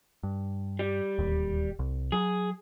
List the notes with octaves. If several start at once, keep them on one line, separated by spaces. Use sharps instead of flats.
G2
G3
D1 D#2
C2
F#3 G#4